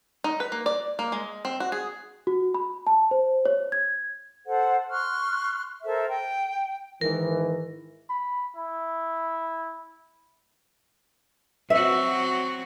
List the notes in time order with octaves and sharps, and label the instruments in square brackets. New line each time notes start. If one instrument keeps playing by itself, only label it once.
[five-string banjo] D#4
B4
A#3
D5
A#3
G#3
C4
F#4
G#4
[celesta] F#4
B5
A5
C5
C#5
G#6
[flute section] A4 C5 F#5
C6 C#6 F6 F#6
A4 A#4 C5 E5
G5
[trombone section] G#2 D#3 E3 [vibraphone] A#4
[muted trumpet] B5
E4
[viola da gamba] F#3 C4 F#4 [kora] E5